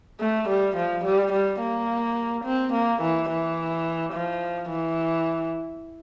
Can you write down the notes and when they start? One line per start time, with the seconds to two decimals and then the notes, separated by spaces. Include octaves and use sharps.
0.20 A3
0.48 G3
0.77 F3
1.05 G3
1.32 G3
1.60 A#3
2.45 C4
2.73 A#3
3.02 E3
3.30 E3
4.13 F3
4.69 E3